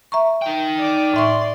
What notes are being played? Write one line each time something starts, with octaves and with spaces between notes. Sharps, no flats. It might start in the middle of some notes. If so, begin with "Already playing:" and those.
E5 A#5 C#6
D#4 G5
D5 D6
A2 D5 E5 C6 C#6